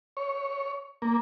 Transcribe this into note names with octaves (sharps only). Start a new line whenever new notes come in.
C#5
A#3